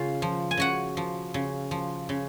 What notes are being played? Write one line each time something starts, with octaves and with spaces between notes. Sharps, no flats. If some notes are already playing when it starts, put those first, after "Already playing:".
Already playing: C#3 F4 F5
F3
G#5
C#3 F#4 F#5
F3
C#3
F3
C#3